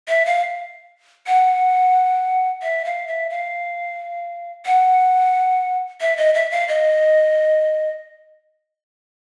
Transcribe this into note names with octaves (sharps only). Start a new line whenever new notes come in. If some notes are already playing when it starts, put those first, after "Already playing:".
E5
F5
F#5
E5
F5
E5
F5
F#5
E5
D#5
E5
F5
D#5